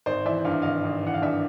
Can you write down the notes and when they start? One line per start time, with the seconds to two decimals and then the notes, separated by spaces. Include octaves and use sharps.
0.06 G#1 C5 D5
0.25 E3 D5 E5
0.45 G2 F5
0.54 E5
0.62 G#1 D#5 F5
0.84 G#1
1.03 E3 F#5
1.14 F5
1.22 G2 D5 E5